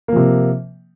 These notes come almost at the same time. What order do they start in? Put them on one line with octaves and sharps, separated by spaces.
A#3 F3 C3